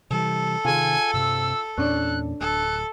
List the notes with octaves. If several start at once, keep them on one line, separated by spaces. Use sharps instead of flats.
C3 E3 G3 A4
C3 D#3 F4 G#4 G#5
G2 C3 E6
E2 A#2 C#4 D4 C#5 F#6
D1 A4 F#6